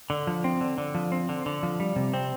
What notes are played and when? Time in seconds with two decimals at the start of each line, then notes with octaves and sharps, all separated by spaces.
0.10 D3
0.27 F3
0.44 C4
0.61 D3
0.78 D3
0.95 F3
1.12 C4
1.29 D3
1.46 D3
1.63 F3
1.80 G3
1.96 C3
2.14 C4